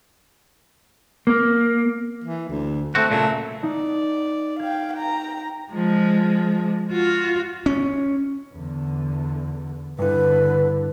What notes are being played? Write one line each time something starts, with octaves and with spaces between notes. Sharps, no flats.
A#3
E3
D2
A3 C4 F#4
A#2 C#3 F#3 A3
D#4 D5
F5 G5 G#6
G5 A#5
F3 G#3
F4 F#4
C#4
E2 D3
G2 D3 E4 B4